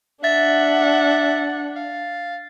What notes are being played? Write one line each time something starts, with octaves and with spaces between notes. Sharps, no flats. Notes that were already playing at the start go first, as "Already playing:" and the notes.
D4 E5 F#5 A6
F5